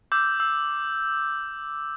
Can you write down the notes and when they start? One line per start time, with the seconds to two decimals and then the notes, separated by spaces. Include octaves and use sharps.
0.12 D6 E6 G6
0.40 E6